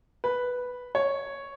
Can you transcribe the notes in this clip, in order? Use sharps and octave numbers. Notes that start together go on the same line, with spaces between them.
B4
C#5